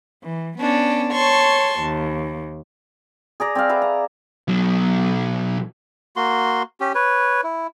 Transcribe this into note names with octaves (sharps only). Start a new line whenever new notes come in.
E3
B3 C#4 D4
C#5 A5 C6 C#6
D#2
G#4 D5 A#5
C4 D5 F5
B4 E5 F5
A#5
B1 F#3
A#3 F#4 C6
C#4 G4
B4 C#5
E4